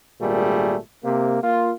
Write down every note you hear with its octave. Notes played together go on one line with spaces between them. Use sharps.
G#1 A#2 G3 A3 G#4
C3 A#3
A#3 F4